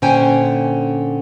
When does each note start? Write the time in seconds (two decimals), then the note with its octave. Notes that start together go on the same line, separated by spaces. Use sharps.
0.02 A#2 D3 C#4 C5 G5 G#5